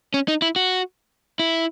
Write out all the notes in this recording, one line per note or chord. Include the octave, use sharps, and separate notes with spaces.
C#4
D#4
E4
F#4
E4